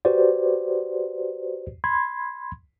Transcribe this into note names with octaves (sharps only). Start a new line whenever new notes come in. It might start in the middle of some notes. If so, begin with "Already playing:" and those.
F#4 G4 B4 C5 D5
B5 C6 G#6